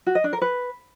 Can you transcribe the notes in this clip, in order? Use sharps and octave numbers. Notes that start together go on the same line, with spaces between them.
F#4
D#5
D4
A#4
B4